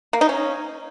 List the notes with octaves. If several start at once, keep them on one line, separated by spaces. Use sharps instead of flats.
A#3
D#4
C#4